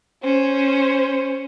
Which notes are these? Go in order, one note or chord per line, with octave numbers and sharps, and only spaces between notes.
C#4 C5